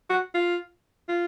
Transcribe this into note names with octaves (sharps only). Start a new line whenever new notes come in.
F#4
F4
F4